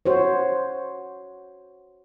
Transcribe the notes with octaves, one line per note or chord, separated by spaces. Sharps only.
F#4 C5 C#5